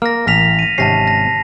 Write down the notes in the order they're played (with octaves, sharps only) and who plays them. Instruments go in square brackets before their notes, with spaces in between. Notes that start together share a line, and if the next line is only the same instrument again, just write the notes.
[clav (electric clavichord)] A#3 [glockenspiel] F6 A#6
[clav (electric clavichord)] A1 [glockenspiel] F6 B6 F7
[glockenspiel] A#6 D#7
[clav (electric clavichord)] G#1 C3 C#4 [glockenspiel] A5 A#6 C7
[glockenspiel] A#6